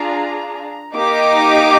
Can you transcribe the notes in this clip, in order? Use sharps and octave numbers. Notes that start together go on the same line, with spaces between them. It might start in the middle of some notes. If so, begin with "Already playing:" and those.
Already playing: D4 F4 G#4 A#5
A#3 D#4 G4 D6